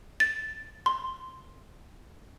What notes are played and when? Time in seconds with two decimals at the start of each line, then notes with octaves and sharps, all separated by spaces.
0.20 A6
0.86 C6